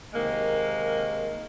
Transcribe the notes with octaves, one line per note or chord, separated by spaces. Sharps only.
C3 D#3 G#3 A#3